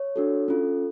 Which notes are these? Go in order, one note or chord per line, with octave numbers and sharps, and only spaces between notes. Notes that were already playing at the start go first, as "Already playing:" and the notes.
Already playing: C#5
D4 F#4 A4
C#4 F4 A4